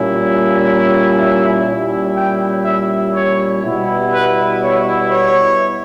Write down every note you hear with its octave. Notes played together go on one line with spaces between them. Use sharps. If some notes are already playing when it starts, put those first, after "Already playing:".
Already playing: A#2 G3 C#4 E4
E5
A#2 G3 C#4 E4
G5
E5
C#5
B2 G3 B3 E4
B4
C#5
C#5